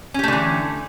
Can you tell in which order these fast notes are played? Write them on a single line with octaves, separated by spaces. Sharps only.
C#4 G4 A3 D3 E3